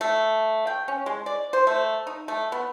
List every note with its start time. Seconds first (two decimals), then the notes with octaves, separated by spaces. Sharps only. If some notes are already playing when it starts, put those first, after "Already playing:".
0.01 A3
0.67 G5
0.88 C#4
1.06 G#3
1.26 D5
1.53 C5
1.67 A3
2.07 D#4
2.28 A3
2.52 B3